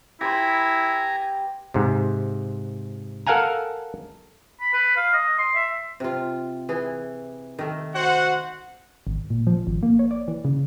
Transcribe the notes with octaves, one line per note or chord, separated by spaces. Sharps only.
E4 G4 B4 G#5 A#5 C6
G#2 C3
A4 A#4 F5 F#5 G#5 A#5
B5
B4
F5
D#5
C6
E5
C3 F4
E3 G#4
D#3 A3
F#4 C5 F#5
G#1
A#2
F3
G#1
A#3
C#5
D5
E3
C#3